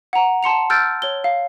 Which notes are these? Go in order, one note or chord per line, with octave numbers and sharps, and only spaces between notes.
F#5 A#5
A5 C6 C#7 F7
E6 F6 G6 A6 D7
C#5 G7
F5